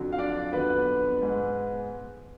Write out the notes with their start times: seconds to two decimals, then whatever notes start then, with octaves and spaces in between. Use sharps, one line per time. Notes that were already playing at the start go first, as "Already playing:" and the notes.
Already playing: F2 D3 F#3
0.12 F5
0.18 D4 D5
0.52 F2 D3 F#3 B3 B4
1.21 G#2 G#3 B3